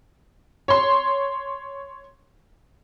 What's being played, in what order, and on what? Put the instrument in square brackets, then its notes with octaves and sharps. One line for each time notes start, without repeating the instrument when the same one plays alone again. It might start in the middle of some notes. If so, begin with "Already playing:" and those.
[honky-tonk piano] C#5 C6